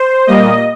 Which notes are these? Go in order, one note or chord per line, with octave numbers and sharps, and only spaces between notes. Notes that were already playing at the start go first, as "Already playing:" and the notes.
Already playing: C5
A#2 G3 A#3 D#5